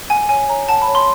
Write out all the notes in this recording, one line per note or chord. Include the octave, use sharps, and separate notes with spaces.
F#5 G#5
C#5 G#5
C#5 A#5
F#5 A5
B5
C#5
C6